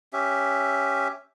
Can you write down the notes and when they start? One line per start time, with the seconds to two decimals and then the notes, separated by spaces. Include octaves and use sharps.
0.13 C#4 G4 E5